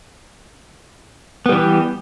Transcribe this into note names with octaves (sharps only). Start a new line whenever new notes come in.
E3 G3 B3 G4